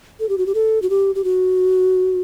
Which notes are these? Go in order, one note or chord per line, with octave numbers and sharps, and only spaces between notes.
A4
G4
F#4
G4
A4
F#4
G4
G4
F#4